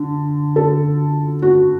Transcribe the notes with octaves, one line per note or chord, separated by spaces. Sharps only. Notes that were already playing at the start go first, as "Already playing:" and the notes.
Already playing: D3
A4
F#4